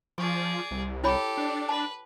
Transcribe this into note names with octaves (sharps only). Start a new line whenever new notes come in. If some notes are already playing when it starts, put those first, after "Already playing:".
F3 G#4 D5 C#6
C2
E4 G4 A4 C#5 B5
D4
B4 A5